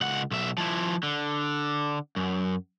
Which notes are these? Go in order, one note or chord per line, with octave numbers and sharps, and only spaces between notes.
C#2 F#5
B1 E5
F3 E4
D3
F#2